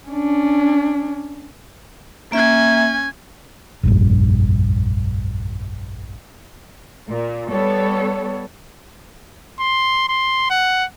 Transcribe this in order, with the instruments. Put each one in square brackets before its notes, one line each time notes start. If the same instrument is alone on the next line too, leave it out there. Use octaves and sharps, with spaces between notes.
[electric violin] C#4 D4
[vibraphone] A#3 E5 [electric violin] C#4 G#5
[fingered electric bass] F1 A#1 G2
[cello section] A#2
G3 B3 A4 C#5
[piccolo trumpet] C6
C6
F#5